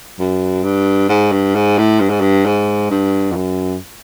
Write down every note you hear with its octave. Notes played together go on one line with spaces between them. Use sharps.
F#2
G2
G#2
G2
G#2
A2
G2
G#2
G2
G#2
G2
F2
F#2